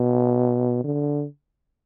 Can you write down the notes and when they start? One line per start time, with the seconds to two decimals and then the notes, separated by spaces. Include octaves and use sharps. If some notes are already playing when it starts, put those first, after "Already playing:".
Already playing: B2
0.84 D3